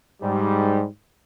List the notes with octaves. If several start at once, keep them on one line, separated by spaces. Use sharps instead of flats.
G#2 G3